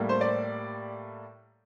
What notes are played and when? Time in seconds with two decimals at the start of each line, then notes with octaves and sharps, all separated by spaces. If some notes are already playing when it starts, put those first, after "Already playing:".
Already playing: A2 G3 A#3
0.09 C5
0.21 D5